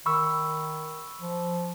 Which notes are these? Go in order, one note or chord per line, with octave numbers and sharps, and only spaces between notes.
D#3 B5 C#6 E6
F3